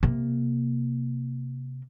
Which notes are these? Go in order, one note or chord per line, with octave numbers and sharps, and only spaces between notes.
C3 A#3